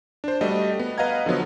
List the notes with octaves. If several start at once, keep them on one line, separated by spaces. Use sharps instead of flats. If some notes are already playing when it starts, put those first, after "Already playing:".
D4 C5
G3 A3 F#4 D#5
B3
B4 D#5 F5 F#5 A#5 G#6
D3 F3 F#3 B3